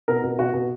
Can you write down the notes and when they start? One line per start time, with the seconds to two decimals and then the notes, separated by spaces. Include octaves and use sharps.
0.08 B2 A#4
0.24 B2
0.38 B2 F#4
0.54 B2